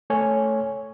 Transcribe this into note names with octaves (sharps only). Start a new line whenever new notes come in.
A3 C#5 G#5